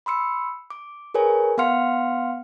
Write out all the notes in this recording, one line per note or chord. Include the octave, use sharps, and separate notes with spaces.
B5 C6 E6 C#7
D6
G#4 A#4 B4 C#5 G#5
B3 F5 F#5 C6 F6 C#7